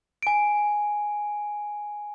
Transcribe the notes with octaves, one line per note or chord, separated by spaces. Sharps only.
G#5 D7